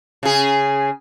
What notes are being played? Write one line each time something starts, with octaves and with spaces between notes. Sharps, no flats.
C#3 G#4